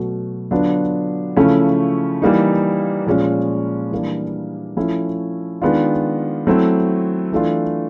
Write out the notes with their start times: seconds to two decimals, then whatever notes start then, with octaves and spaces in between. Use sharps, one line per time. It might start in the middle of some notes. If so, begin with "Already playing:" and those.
Already playing: B2 F#3 A3
0.51 D3 F#3 B3 D4 F4
1.37 C#3 F3 A3 C#4 E4
2.22 E3 G3 A#3 D#4
3.07 A#2 F3 G#3 C#4 F4
3.91 E3 G3 A#3 D4
4.77 F3 A3 C#4 E4
5.62 D#3 G#3 B3 D4 F4
6.47 F#3 A3 C4 E4
7.32 E3 A3 D4 F4